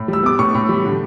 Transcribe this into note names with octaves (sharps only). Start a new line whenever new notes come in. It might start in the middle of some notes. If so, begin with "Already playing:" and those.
Already playing: A2
G3
E6
B3 D6
A2 C#6
A2
G3
D3